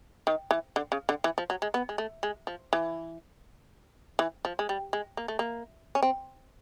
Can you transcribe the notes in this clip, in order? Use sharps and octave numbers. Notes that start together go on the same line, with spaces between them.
D#3
E3
D3
C#3
D3
E3
F3
F#3
G#3
B3
G#3
A3
G#3
F3
E3
E3
F3
G#3
G3
G#3
A#3
A3
A#3
C#4
C4